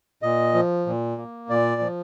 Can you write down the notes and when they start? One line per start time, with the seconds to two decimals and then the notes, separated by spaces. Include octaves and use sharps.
0.22 A#2 D#5
0.54 F3
0.86 A#2
1.18 A#3
1.49 A#2 D5
1.81 F3